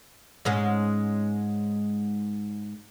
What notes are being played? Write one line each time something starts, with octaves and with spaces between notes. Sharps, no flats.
G#2 G#3 C#4